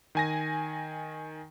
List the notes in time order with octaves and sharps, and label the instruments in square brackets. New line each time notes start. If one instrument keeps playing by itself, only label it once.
[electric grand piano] D#3 G#5 A#6